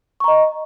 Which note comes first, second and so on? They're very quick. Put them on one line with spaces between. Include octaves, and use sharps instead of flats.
C#6 A#5 D#5